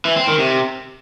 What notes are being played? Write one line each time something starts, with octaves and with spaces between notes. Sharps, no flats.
E3
C4
D#3
C3